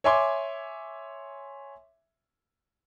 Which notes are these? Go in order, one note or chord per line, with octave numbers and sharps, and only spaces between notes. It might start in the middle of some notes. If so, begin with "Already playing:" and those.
C#5 E5 G#5 C6 D6